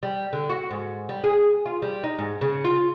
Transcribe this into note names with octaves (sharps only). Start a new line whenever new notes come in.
G3
D3
F#4
G#2
G3
G#4
F4
G3
D#4
G#2
C#3
F4